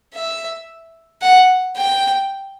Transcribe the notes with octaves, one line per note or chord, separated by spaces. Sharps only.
E5
F#5
G5